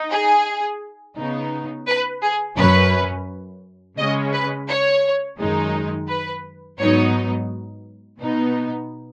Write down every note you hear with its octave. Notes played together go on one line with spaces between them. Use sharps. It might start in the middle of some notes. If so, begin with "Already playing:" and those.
Already playing: D#4
G#4
C#3 B3 D#4
B4
G#4
F#2 F#3 C#4 B4
C#3 G#3 C#4 D#5
B4
C#5
F#2 D#3 G#3 D#4
B4
G#2 F#3 B3 D#4 C#5
B2 B3 D#4